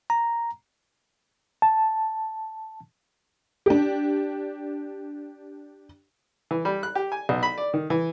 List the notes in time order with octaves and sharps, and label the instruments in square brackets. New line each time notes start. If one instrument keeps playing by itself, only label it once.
[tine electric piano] A#5
[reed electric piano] A5
[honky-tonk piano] D4 G4
[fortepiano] E3
G3
F#6
G4
G#5
B1
B5
D5
D#3
E3